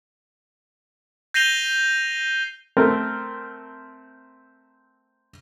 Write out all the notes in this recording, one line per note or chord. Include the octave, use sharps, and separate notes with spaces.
G6 A#6 C7 D#7 F7 G7
A3 C4 A#4